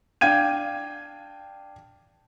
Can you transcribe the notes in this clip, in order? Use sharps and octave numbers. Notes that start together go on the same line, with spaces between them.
D4 F5 G5 G#6 D#7